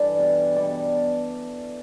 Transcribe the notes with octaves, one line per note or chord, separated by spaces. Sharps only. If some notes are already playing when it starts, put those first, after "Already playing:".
Already playing: G2 E3 A4 D5
B2 G3
B2 G3 D5